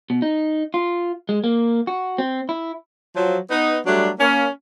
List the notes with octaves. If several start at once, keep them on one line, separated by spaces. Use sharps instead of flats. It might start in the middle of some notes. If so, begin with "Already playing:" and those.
B2
D#4
F4
G#3
A#3
F#4
C4
E4
F3 F#3
B3 D#4
F#3 G3 A3 D4
A#3 C#4